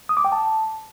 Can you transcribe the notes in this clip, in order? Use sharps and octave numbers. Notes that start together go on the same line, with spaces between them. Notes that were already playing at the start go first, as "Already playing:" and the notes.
D#6
D6
G5
A5